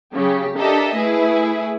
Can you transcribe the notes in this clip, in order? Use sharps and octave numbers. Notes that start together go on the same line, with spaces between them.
C#3 F#3 G4
D4 G4 A4 A#4 D#5 E5
A3 E4 G#4 B4